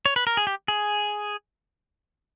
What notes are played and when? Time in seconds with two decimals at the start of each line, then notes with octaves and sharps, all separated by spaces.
0.06 C#5
0.16 B4
0.27 A#4
0.37 G#4
0.47 G4
0.68 G#4